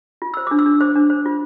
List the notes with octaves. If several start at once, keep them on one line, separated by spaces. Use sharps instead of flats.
F4
C5 E6
D4 D6
E6
D4
C5 D6
D4
C5
F4